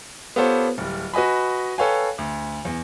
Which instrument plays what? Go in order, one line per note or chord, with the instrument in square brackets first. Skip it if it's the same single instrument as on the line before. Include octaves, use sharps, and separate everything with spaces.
[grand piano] B3 F4 G4 A4 C5 C#5
D1 G3
F#4 B4 D#5 G#5 B5
A4 B4 C#5 F5 G5 G#5
D2
E2